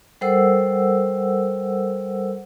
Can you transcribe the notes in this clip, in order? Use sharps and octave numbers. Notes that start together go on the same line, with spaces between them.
G3 A4 A#4 C5 F#5 E6